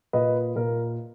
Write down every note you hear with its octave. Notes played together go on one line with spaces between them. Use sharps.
A#2 B4 D#5
A#2 A#4